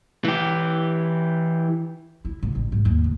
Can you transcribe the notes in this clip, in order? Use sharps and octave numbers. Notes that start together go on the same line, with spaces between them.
E3 G4
E4
G#2
A1
G#2
D#2
D2